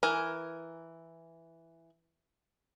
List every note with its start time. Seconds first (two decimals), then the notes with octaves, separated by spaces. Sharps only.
0.03 E3 A#4 G#5